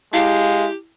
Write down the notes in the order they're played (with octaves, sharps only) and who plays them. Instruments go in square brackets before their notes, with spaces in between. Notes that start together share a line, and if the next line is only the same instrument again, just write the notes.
[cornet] G#3 [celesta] E4 [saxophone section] G4 [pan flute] F5